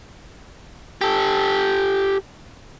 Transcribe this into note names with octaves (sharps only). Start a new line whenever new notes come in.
G4 A4